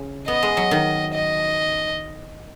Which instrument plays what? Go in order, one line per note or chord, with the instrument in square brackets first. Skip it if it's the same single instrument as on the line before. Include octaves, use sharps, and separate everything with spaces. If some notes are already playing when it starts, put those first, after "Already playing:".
Already playing: [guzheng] C#3 C#4
[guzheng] B3 [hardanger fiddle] D#5
[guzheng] G#3
F#3
D#3
[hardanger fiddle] D#5